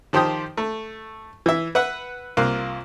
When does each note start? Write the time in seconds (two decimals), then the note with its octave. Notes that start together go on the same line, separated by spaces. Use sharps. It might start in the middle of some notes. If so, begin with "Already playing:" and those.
0.13 D#3 F3 G4 C5 G5 D#6
0.57 A3
1.46 E3 E5
1.75 B4 E5 F#5
2.37 C2 A#3 F4 F5 F#6